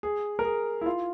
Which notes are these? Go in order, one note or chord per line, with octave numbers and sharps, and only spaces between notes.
G#4
A#4
G#4
E4
F4